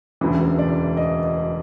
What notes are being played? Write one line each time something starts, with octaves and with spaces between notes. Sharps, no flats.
E1 D2 C#3 E3
D5
D#5